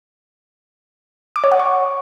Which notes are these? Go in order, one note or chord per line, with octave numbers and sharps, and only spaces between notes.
D6
C#5
F#5
C#6